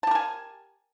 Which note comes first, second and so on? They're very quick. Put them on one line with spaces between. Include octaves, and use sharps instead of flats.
A5 G4 A#4 G#5